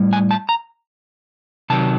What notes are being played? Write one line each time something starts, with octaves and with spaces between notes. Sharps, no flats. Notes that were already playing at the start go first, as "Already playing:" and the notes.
Already playing: A2 G3
G#5
A5
A#5
C3 D#3 F#3 A5